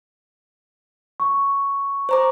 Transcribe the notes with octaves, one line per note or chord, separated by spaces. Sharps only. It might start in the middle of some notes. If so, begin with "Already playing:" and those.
C#6
C5 A#5 D6